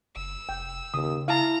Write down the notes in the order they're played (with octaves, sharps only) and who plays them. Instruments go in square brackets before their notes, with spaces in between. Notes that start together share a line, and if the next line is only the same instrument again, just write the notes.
[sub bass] F#1 [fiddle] E6
[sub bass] F1 [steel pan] G5
[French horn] D#2 [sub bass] C#3 [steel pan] D#6
[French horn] E4 [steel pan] F5 A5 [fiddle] A#5